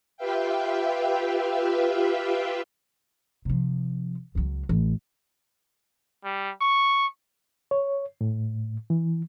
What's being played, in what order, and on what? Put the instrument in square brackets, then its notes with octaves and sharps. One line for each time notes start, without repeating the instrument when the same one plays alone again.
[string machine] F4 G4 B4 E5 F5 G5
[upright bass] C3 F3
C#2 F#3
A1
[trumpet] G3
C#6
[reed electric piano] C#5
A2
E3